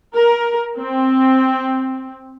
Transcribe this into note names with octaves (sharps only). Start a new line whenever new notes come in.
A#4
C4